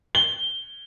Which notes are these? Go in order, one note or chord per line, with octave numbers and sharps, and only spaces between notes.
G7